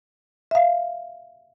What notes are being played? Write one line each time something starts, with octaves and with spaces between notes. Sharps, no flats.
E5 F5